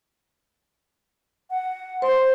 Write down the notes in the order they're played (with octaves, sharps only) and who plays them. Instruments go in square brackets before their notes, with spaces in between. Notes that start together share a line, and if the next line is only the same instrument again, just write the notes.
[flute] F#5
[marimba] C5 [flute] C6